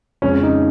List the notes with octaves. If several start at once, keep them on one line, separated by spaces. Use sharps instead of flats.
F2 C#3 F3 G#3 C#4
D#4